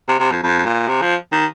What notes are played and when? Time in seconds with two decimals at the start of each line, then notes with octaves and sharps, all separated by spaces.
0.09 C3
0.20 C3
0.32 F2
0.43 F2
0.65 A#2
0.88 C3
1.02 F3
1.32 D#3